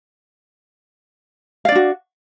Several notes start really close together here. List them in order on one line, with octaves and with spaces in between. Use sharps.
F5 D5 D4 F#4